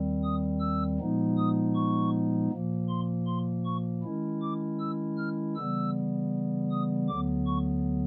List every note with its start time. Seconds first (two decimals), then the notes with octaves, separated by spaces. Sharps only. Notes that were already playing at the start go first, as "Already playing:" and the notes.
Already playing: D#2 D#3 G3 C4
0.23 D#6
0.60 E6
0.98 A#2 F3 G#3 B3 D#4
1.37 D#6
1.75 C#6
2.52 A#2 F3 A#3
2.89 C6
3.27 C6
3.66 C#6
4.03 D#3 G#3 C#4 E4
4.42 D6
4.80 E6
5.17 F6
5.56 C#3 E3 G3 B3 E6
6.71 D#6
7.08 D2 D3 F#3 B3 D6
7.47 C#6